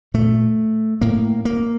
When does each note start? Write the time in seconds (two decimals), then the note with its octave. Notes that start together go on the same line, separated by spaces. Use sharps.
0.14 A#2 A3
1.01 A2 A#3
1.45 A#3